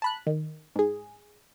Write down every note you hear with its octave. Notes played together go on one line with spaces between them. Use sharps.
A5 B5 F#6
D#3
G#2 G#4